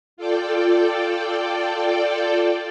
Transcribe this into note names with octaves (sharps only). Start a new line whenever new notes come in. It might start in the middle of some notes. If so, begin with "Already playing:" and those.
F4 A4 D5 G5